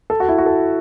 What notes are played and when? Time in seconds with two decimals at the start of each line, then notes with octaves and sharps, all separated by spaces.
0.10 A4
0.20 F#4
0.29 E4
0.38 F#4
0.46 A4